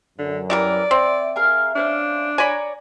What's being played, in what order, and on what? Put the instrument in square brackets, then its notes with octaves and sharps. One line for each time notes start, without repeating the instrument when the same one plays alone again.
[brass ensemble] F#2 [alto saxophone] D3
[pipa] E3 G3 A#4 [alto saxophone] D5
[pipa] C4 [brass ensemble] E5
[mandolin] G#4 A#4 F5
[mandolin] C#4 C5 F5 [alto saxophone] D4
[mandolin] C#5 D5 A#5 [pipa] G#5 B5